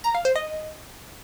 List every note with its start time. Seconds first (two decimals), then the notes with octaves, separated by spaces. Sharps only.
0.04 A#5
0.15 F5
0.25 C5
0.36 D#5